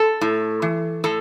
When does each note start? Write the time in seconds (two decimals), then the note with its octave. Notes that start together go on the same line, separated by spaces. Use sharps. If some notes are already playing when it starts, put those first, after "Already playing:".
Already playing: A4
0.21 A2
0.62 E3
1.04 A2 A4